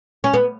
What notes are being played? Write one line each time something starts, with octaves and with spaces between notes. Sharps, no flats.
C#4
B3